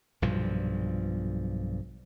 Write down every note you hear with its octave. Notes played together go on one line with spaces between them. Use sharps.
B1 G2 A#2 F3